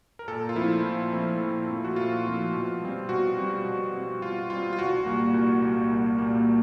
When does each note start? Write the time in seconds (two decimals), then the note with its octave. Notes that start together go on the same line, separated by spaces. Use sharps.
0.19 A#4
0.28 A#2 A4
0.49 F4
0.55 F3 A3 C4 E4
0.84 A#2
1.12 F3 A3 C4
1.40 A#2
1.68 F3 A3 C4
1.84 F#4
1.96 A#2 F4
2.25 F3 A3 C4
2.53 B2
2.81 G3 C4
3.09 B2 F#4
3.37 G3 C4
3.65 B2
3.94 G3 C4
4.22 B2 F4
4.49 G3 C4 F4
4.73 F4
4.78 C2 F#4
5.06 A#2 G3 A#3
5.34 C2
5.62 A#2 G3 A#3
5.91 C2
6.18 A#2 G3 A#3